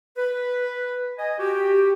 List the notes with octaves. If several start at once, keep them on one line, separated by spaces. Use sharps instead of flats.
B4
D#5 G#5
F#4 G4